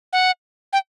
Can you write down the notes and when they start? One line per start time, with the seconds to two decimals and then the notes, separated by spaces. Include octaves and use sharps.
0.13 F#5
0.73 G5